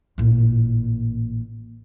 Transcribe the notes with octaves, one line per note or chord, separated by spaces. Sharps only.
A1 A#2